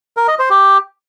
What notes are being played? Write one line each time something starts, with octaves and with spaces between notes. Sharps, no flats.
A#4
D#5
C5
G4